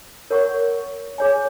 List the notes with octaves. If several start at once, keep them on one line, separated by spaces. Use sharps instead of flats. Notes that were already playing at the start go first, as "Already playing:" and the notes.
A#4 C#5 F#5 C#6
G#4 C#5 G#5